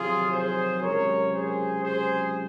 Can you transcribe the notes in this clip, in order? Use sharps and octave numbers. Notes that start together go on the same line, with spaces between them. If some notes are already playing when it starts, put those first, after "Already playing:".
Already playing: F2 C3 D#3 F#3 F4 G#4
G#4 C5
C#2 C3 F#3 A#4 C#5
G#4 C5
G#4 C5